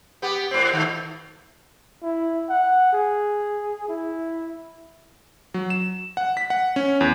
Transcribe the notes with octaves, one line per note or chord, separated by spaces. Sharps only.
B3 G4
A2 C4
B2 D#3 A3
E4
F#5
G#4
E4
F#3
E7
F#5
B6
F#5
C#4
E2